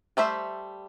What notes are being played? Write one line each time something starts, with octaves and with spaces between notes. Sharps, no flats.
G3 A3 C5 E5